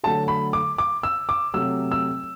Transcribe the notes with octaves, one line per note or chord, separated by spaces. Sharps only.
D3 F#3 A3 A5
B5
D6
D6
E6
D6
C3 F#3 A3 E6
E6